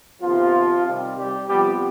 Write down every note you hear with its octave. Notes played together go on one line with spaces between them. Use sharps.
C3 D#3 F3 B3 F4
C3 D#3 G3 C4
G3 G4
C3 F3 G3 B3 G4